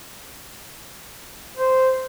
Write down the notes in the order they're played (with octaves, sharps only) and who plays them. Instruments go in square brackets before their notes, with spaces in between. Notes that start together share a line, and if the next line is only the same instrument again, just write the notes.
[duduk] C5